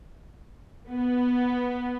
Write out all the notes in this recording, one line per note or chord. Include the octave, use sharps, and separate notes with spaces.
B3